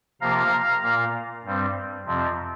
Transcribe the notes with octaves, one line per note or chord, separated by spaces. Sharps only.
C3 F3 A#3 F5 A#5
A#2 A#3
G2 G3 C4
F2 C3 F3 C4